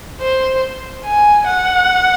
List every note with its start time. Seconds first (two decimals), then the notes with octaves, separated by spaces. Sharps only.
0.21 C5
1.04 G#5
1.47 F#5